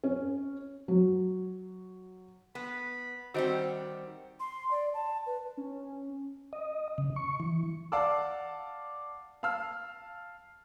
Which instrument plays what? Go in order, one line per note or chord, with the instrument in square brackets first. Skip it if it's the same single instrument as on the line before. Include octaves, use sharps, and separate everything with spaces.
[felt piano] C#4
F#3
[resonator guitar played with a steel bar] B3 [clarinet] B5
[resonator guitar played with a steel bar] D#3 G3 C4 [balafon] F#4 C5 D#5 [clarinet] F#5
[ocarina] C6
D5
A5
B4
[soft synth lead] C#4
[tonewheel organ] D#5
C#3
C#6
E3
[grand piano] D5 F5 F#5 A5 D6 E6
F5 A5 E6 F6